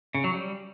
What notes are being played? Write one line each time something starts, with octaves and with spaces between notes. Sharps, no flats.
C#3
F#3
G3